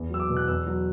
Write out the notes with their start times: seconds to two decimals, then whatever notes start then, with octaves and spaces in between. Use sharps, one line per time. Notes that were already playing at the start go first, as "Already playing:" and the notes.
Already playing: E2
0.10 F#3 E6
0.20 D6
0.29 B2
0.37 F#6
0.48 E2 E6
0.67 F#3